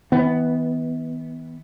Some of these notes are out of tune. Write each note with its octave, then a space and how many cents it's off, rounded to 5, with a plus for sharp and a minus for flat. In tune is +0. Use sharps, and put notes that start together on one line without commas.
E3 -45 B3 +0